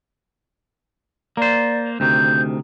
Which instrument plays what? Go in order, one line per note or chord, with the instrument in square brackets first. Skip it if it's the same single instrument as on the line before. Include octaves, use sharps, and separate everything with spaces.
[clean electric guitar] A#3 C5 [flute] D5
[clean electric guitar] D2 C3 D#3 [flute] G6